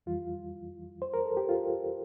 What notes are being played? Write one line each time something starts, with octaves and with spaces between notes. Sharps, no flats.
F2 E3 G3 F4
C5
A#4
A4
G4
F4